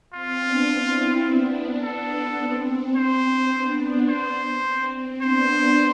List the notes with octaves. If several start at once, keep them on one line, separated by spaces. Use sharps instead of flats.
C4 F4
B3 D4
C4 E4
B3 D4
A4
C4
C4 C5
B3 D4
C5
C4
C4
B3 D4 C5